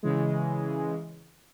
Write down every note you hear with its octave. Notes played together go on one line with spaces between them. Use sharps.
C#3 E3 G#3